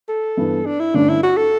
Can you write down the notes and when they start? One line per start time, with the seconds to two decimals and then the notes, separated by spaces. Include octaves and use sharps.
0.09 A4
0.37 G2 E3 B3
0.66 D4
0.79 E4
0.94 G2 D3 A3 C#4 D4
1.09 E4
1.23 F#4
1.37 A4